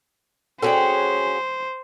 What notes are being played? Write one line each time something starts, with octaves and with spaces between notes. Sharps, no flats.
C#4 F#4 G#4 A4 C5 G5